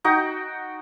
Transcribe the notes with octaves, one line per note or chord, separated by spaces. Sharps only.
D#4 F#4 G5